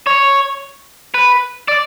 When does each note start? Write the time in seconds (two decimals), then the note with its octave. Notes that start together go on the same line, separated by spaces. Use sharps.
0.07 C#5
1.14 B4
1.68 D5